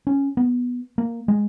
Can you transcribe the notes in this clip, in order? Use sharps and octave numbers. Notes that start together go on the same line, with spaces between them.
C#4
B3
A#3
G#3